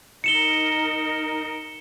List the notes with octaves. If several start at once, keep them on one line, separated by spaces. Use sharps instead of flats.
D#4 A#4 C#7 E7 G7